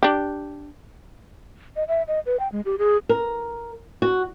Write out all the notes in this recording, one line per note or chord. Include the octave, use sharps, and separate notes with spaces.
D4 G4
D#5
E5
D#5
B4
G5
G#3
G4
G#4
A#4
F#4